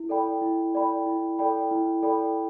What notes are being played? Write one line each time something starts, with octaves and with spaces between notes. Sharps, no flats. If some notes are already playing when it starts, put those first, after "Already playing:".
Already playing: E4
A4 D5 G5 B5
E4
A4 D5 G5 B5
E4
A4 D5 G5 B5
E4
A4 D5 G5 B5